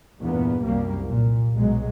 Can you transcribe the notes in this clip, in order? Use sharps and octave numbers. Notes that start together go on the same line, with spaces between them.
E2 G2 A#2 B3
C2 F#2 G3 A#3
A#2
B1 F#3 G#3